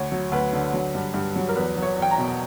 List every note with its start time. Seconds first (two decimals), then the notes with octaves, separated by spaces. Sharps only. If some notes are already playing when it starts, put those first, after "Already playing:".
Already playing: D2 C#5
0.12 F#3
0.32 D2 B4
0.53 D3
0.74 F#3
0.95 G2
1.14 G2
1.36 F#3
1.49 A#4
1.56 E2 B4
1.76 F#3
1.82 C#5
1.96 E2
2.02 G5
2.11 A#5
2.18 B2